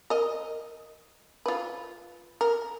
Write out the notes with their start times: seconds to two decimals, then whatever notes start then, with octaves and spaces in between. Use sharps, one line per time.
0.10 A#4 D#5
1.46 F4 B4
2.41 A#4